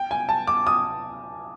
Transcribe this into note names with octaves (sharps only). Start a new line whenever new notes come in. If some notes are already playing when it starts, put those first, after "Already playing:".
Already playing: G5
G#5
A5
D6
D#6